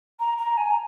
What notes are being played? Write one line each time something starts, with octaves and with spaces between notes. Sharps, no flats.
A#5
A#5
G#5
A#5